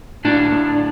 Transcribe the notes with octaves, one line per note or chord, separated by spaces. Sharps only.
A2 D4
A2